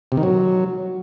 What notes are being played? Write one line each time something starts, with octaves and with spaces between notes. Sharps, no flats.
C3
D#3
F#3